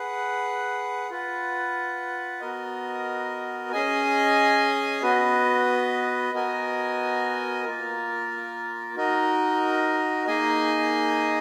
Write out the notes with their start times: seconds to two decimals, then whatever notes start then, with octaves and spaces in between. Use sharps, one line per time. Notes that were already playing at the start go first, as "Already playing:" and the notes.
Already playing: G#4 B4 F#5
1.11 F4 B4 F#5
2.41 B3 F#4 A#4 D#5
3.72 C#4 G#4 D#5 G#5
5.02 B3 F#4 B4 D#5
6.34 B3 F#4 A#4 D#5 G#5
7.64 A#3 F4 A#4
8.96 D#4 F#4 A#4 D#5
10.27 A#3 D#4 G#4 D#5 G#5